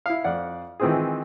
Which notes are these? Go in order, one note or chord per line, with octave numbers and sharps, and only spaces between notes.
E4 F5
F2 D5 F#5
D#3 E3 G#3 C4 F4 G#4